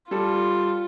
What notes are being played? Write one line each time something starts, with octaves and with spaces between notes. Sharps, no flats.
G3 F4 A4